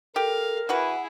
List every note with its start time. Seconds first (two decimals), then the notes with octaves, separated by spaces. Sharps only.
0.16 G4 A4 A#4 F5
0.69 E3 E4 F#4 G#4 B4 F#5